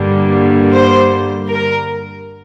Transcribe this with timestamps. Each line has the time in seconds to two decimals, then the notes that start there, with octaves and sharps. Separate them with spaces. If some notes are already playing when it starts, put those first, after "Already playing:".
Already playing: G2 D3 G3 A#3
0.73 C5
1.48 A#4